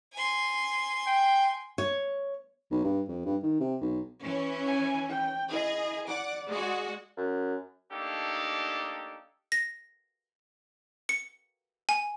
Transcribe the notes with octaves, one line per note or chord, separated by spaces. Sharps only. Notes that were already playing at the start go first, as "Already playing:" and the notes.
G#5 C6
G5
C#5
B1
G2
F2
G2
D#3
C3
B1
E3 C#4
G#5
G5
E4 G#4 D#5
D5 F#5 D6
G#3 F#4
F#2
A3 A#3 D4 D#4 G4 A4
A#6
C#7
G#5